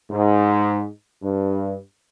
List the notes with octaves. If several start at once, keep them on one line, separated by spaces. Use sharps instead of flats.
G#2
G2